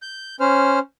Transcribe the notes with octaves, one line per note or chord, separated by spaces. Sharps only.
G6
C#4 C5 F6